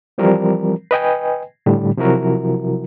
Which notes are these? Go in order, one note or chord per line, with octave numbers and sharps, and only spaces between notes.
E3 F3 G3 C4 A#4
B4 D#5 G5 G#5
A2 D3 G3
C3 F3 F#3 E4 F#4 A#4